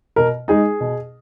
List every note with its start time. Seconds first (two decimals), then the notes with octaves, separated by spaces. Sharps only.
0.16 B2 A#4
0.48 G#3 D#4 G#4
0.81 B2